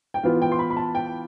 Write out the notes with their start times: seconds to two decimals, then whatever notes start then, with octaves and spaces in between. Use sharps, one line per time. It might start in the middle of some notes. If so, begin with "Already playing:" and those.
0.14 G5
0.23 E3 B3 F4 F5
0.42 G5
0.52 C6
0.59 B5
0.70 B5
0.77 A5
0.95 G5